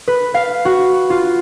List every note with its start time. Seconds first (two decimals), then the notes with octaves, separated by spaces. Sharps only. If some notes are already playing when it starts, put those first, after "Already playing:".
0.08 B4
0.34 F5
0.65 F#4
1.10 F4